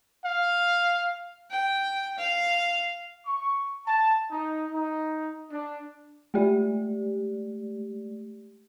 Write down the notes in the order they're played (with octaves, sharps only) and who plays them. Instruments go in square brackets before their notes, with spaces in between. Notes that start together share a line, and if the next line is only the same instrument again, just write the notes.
[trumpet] F5
[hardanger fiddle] G5
F5
[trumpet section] C#6
A5
D#4
D#4
D4
[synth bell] G#3 A3 G4 D5